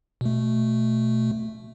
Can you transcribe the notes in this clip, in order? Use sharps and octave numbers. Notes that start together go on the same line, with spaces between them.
B2 A3